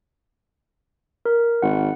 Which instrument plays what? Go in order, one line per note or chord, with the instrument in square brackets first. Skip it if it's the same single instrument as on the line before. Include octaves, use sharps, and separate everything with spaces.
[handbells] A#4
[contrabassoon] G#1 [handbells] F#5